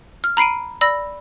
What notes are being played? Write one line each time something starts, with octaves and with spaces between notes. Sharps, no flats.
F6
A#5 B5 C7 D7 D#7
D5 B5 E6 A#6